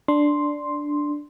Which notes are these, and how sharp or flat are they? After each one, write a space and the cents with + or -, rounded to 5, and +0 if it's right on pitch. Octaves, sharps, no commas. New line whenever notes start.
D4 +0 C6 +0